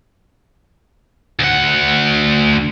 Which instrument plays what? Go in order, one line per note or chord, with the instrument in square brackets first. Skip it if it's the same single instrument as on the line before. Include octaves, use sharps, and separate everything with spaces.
[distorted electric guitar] D2 F#5